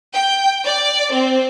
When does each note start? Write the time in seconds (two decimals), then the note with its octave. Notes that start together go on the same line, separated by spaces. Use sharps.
0.12 G5
0.65 D5
1.11 C4